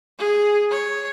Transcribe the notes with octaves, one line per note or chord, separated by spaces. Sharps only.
G#4
C#5